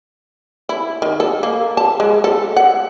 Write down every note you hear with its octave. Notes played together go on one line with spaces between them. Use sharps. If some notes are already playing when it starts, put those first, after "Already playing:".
E4
D#3
A4
A#3
A5
G#3
A4
F#5